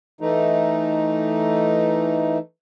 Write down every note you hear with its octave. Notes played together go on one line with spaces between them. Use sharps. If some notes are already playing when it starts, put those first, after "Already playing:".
E3 A3 D#4